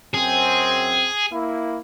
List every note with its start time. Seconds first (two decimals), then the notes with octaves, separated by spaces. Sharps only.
0.14 F#2 C4 G#4
1.31 A#3 E4